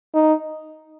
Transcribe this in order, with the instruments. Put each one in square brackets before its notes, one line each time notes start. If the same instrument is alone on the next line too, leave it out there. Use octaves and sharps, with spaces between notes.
[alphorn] D#4